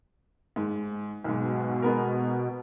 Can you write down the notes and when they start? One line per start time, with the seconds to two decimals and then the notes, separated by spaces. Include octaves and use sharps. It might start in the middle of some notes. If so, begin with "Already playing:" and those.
0.56 G#2
1.24 B1 G#2 B2
1.82 G#3 B3 A#4